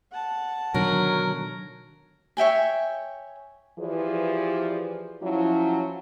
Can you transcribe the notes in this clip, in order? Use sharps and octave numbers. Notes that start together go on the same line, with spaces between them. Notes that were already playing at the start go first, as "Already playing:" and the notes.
F#5 A5
B2 D3 D#3 F#3 A#4
C#5 E5 G5 G#5
E3 F3 G4 G#4 B4 D5
F3 F#3 C#4 E4